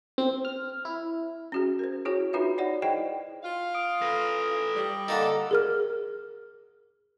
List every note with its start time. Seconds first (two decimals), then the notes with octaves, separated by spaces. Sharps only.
0.18 C4
0.45 F6
0.85 E4
1.52 C#4 F#4 G#4
1.79 A#4 C5
2.05 E4 F#4 G#4 C#5
2.33 D4 D#4 F4 F#4 B4 E5
2.58 D#4 C#5 D5 F#5
2.82 D#4 E4 G#4 C5 D#5 G5
3.43 F4 F5
3.74 D#6 D7
4.02 A4 B4 A#6
4.75 G3
5.08 D3 A#3 D#4 A4 A6
5.51 G#4 A#4 F6